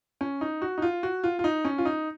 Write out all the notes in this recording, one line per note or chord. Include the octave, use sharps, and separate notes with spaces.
C#4
D#4
F#4
D#4
F4
F#4
F4
F4
D#4
C#4
F4
D#4